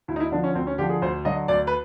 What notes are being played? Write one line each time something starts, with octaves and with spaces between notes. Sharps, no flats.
D2 E4
D#4
E4
D3 F3 D4
C#4
D2 C4
C#4
D3 F3 G4
G#4
D2 C5
D3 F#3 D#5
D2 D5
B4